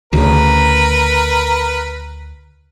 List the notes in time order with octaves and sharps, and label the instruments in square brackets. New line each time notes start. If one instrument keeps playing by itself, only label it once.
[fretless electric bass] D2 C#3 [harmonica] A#4 B4